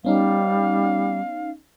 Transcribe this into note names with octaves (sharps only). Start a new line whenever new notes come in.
G3 B3 C#4 D#4 F5